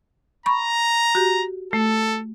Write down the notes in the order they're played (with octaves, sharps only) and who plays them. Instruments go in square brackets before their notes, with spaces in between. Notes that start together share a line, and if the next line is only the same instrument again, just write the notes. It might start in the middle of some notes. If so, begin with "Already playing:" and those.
[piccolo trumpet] A#5 [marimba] B5 C#6
[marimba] F#4 G4
[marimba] A3 [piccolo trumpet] A4